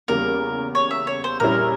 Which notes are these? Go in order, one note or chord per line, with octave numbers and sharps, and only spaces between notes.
E2 C#3 G3 A#3 A#4
C#5
E5
C#5
C5
A#1 A#2 G3 C#4 E4 A#4